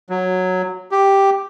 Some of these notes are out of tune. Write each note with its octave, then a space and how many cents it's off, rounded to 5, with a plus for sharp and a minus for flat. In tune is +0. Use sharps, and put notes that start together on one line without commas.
F#3 -5
G4 +0